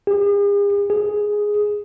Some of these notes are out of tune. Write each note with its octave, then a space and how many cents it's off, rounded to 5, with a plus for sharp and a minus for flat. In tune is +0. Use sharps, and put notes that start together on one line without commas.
G#4 -45
G#4 +0